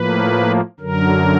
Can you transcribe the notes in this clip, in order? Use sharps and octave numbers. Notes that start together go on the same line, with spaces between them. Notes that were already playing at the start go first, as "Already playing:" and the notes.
Already playing: A2 F3 A#3 B4
F#2 D3 F#3 A#4